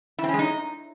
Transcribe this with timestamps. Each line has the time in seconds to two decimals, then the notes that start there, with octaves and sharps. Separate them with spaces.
0.19 E4
0.24 C4
0.29 C#4
0.34 G#3
0.39 D#4